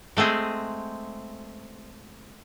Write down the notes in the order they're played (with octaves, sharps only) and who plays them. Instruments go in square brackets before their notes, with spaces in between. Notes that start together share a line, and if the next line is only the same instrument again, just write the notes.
[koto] G#3 A3 C4 G#4 D#5